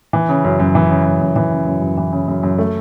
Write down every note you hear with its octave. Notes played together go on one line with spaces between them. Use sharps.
E3
C#3
F#2
F#2
E3
C#3
F#2
F#2
E3
C#3
F#2
F#2
E3
C#3
F#2
F#2
A3